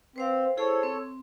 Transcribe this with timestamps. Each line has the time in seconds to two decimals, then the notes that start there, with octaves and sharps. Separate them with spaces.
0.16 C4 B4 C5 F5
0.57 E4 G#4 A4 C5 C#5
0.83 C4